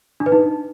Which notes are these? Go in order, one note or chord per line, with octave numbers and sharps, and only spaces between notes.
D4
B4
D#4